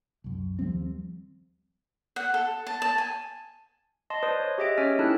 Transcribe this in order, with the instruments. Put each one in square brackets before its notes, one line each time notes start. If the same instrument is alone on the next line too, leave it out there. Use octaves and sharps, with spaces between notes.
[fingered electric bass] C2 F#2
D#2 F3 G3 C4
[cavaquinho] F#5
A4
A5
A5
G#5
[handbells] D#5 A5 C6
B4 C5 D5 A5 D#6
C#5
G4 G#4 D#5 E5 D7
C#4 C#5 G#5 F6 A6 B6
C4 D#4 E4 A4 A5 F#6